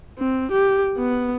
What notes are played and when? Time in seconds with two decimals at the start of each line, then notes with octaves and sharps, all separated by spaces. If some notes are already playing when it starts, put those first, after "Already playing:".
0.18 C4
0.51 G4
0.98 B3